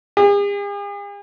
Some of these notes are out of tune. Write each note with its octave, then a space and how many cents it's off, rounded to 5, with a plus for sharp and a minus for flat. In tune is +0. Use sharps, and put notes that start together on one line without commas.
G#4 -45